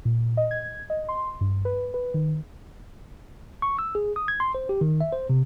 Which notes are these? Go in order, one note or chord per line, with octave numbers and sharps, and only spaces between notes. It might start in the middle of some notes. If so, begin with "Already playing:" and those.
A#2
D#5
G#6
D#5
C6
G2
B4
B4
D#3
C#6
E6
G#4
D#6
G#6
C6
C5
G4
D#3
E5
C5
C3